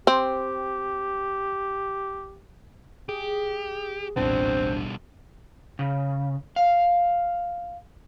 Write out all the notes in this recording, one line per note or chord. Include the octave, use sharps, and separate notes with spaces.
C4 G4
G4 G#4
D#1 A1 B2 G3 C4 D4
C#3
F5